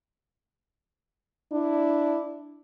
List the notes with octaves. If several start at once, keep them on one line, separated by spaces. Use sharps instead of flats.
D4 E4